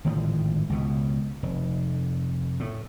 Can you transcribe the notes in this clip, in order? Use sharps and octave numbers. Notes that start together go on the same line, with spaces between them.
G#1 A2 D3 F3
C#2 B2
F1
A2